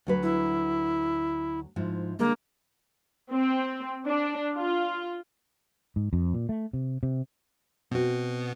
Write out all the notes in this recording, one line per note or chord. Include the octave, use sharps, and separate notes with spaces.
D2 F#3 B4
E4
G#2 F3 E4
D3 G#3 A#3
C4
D4
F4
G#2
F2
A#2
A3
C3
C3
B2 B3 C4 F#4